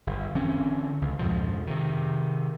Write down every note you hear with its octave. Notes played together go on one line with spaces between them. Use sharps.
G1
D3 E3 C4 C#4
C#2
F2 G#2 B2 F3
C3 D#3